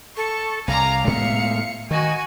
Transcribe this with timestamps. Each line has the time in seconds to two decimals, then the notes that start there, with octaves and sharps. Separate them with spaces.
0.17 A4 C#6
0.68 C2 F5 G#5 A#5 D6
1.07 A2 G#3 B3 E5 C#7
1.91 D#3 F#4 D#5 G#5